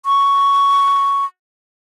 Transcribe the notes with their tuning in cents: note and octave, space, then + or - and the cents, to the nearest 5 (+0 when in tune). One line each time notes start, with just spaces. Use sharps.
C#6 +5